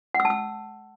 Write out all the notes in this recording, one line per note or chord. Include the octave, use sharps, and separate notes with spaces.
F#5
E6
A5
E6